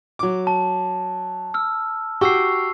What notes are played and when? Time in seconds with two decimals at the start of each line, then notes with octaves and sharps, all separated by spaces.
0.19 F#3 D6
0.47 A5
1.54 E6 F6
2.21 F#4 G4 G5 C#6 E6 C7